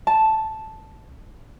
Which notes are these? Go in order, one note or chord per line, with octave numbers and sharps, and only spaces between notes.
A5